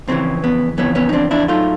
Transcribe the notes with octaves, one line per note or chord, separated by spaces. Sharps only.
F2 C#3 E3 C4
B3
F2 C#3 E3 B3 C#4
B3 C#4
D#4
C4 D4
D4 E4
A2 F#3 A3 D#4 F4